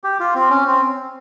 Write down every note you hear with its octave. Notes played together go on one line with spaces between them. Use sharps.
G4
F4
C4
C#4
C4